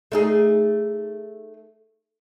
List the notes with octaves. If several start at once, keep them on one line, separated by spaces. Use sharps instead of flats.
A3 D#4 G#4